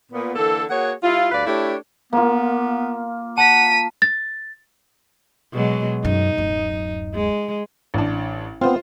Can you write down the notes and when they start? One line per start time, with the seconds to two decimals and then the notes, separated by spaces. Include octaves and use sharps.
0.12 A#2 B3
0.35 D3 E3 A#3 A4
0.70 A#3 F#4 G#4 C#5 F#5
1.03 G3 E4 F4
1.32 D2 G2 B4 D5 F5
1.46 A3 D4 E4 G4 C#5
2.13 A#3 B3 F4
3.38 F#5 A5 B6 D#7
4.02 A6
5.53 B2 F#3 G#3
6.05 F#2 D#4
6.37 D1 F#2
7.14 G#3
7.94 A1 D4
8.61 B3 C4 F4 C5